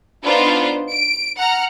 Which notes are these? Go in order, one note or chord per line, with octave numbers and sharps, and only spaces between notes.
B3 D4 D#4 F4 B4 C5
D7
F#5 A#5 F6